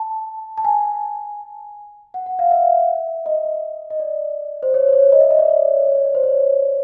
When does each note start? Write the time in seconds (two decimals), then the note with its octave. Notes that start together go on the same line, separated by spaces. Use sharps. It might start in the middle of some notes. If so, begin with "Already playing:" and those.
Already playing: A5
0.58 A5
0.65 G#5
2.14 F#5
2.26 F#5
2.39 F5
2.51 E5
3.26 D#5
3.90 D#5
4.00 D5
4.63 C5
4.74 C#5
4.89 C5
4.93 C#5
5.12 D#5
5.21 E5
5.31 D#5
5.39 D5
5.49 C#5
5.68 C#5
5.87 C#5
5.96 D#5
6.05 D5
6.15 C5
6.24 C#5